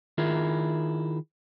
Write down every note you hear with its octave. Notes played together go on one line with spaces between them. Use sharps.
D#3 E4 F4 G#4 A#4